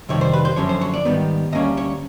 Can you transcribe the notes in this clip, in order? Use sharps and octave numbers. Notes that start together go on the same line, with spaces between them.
F2 C3 D#3 G3 C#5
C5
B4
C5
F#2 D3 F3 C#4 C#5
C5
C#5
D5
G#2 D#3 G3 B3
D2 D3 G3 A#3 C#4 D#5
C#5